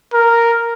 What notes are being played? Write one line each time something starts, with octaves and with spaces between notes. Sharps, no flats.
A#4